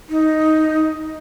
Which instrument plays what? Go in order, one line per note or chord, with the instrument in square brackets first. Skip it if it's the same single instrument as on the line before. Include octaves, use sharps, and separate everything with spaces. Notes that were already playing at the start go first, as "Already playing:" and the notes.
[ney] D#4